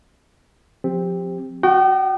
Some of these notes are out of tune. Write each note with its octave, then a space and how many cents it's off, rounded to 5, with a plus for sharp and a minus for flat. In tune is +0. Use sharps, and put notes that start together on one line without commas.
F3 +25 C4 +0 G4 +15
F#4 +0 G5 -35 D#6 -45